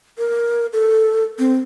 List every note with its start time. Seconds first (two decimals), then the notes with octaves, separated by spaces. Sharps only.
0.18 A#4
0.73 A4
1.39 C4